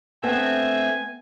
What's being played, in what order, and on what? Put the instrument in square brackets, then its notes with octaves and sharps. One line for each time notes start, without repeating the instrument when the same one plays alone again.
[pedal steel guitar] A3 C4 [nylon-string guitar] B3 [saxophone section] D4 E5 [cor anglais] G#5